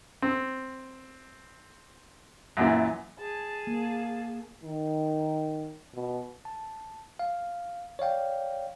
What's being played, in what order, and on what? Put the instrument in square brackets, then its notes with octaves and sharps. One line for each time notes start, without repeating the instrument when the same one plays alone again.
[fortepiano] C4
F#2 A#2 E3
[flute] G#4 [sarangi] A5
[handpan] A#3
[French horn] D#3
B2
[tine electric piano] A5
F5
C#5 D5 F5 G5